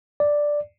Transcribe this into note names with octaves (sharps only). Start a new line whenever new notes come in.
D5